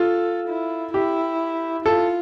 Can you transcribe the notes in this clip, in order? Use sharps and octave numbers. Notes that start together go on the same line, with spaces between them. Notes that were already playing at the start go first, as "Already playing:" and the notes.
Already playing: F4 A4
E4
E4 G4
F4 A4